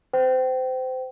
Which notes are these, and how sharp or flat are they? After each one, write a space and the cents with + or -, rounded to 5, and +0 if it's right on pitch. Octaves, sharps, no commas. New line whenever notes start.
C5 -25 G5 -25